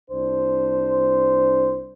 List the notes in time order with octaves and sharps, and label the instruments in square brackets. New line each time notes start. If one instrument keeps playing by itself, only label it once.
[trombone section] C2 D4 C5